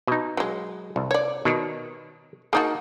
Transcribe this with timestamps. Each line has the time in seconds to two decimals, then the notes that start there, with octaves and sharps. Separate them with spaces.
0.07 B2 D#4
0.37 F#3 G#3
0.96 C2
1.11 C#5 D5
1.45 B2 D#3
2.53 A#3 D#4 F#4 G#4 A5